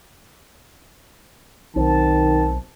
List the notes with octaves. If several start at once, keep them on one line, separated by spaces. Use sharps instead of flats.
B1 D#3 C4 A5